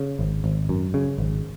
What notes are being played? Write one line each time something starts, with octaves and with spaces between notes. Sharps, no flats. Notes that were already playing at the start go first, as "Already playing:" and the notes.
Already playing: C#3
G#1
G#1
F#2
C#3
G#1